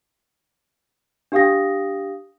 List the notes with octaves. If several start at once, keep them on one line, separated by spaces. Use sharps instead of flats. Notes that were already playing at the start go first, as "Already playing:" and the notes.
D4 G4 F5 G5 D#6 A#6